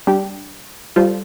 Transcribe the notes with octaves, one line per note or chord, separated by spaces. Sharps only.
G3 D4 G4
G3 F4 A4 C5